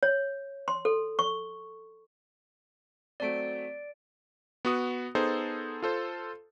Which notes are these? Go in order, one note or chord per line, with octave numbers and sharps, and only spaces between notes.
C#5
C6
A4
C#6
F#3 A3 C4 D5 D7
B3 F#4 D#6
B3 D#4 G#4 A4 C5
F4 A4 C5